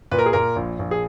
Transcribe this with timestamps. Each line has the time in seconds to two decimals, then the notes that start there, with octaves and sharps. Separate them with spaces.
0.11 A#2 B4
0.19 A#4
0.26 G#4
0.33 A#2 A#4
0.56 A#1
0.79 A#1
0.91 G#4